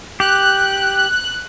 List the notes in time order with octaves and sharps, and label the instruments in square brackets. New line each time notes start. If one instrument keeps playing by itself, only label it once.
[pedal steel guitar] G4 [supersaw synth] F#6